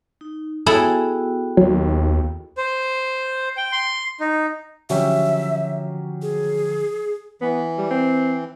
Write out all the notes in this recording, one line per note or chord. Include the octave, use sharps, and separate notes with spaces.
D#4
B3 E4 F#4 G#4 A4 G5
D#2 F#3
C5
G5
C6
D#4
D3 F3 F#3 C#4 G4 E5
G#4
E3 B3
G3
C4